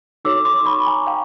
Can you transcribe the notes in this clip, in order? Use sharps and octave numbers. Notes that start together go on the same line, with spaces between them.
D#4 F#4 A4 C#5 D6 E6
C6 D6
B5 C#6
G#5 A#5
F5 G5